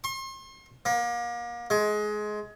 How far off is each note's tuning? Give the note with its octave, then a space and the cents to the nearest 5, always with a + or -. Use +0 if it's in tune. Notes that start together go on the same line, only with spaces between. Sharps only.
C6 +40
A#3 +35
G#3 +20